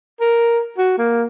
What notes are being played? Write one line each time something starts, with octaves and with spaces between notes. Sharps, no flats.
A#4
F#4
A#3